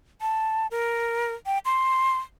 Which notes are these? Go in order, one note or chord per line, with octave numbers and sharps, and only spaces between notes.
A5
A#4
G5
C6